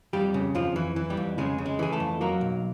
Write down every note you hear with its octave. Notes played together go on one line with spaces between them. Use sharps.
F2 G3 G4
C#3
F2 F3 F4
E3
E3
G3 G4
F2
C#3 G#3 G#4
C#3
G#3 G#4
E3 G#4
A3 A4
F2
F#3 A#3 A#4
B1